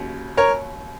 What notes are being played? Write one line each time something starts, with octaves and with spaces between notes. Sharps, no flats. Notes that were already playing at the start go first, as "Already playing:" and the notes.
Already playing: D#2 C#3 F#3
A#4 C#5